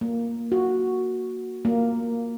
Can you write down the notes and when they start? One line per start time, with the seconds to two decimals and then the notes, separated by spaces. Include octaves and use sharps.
0.01 A#3
0.52 F#4
1.65 A#3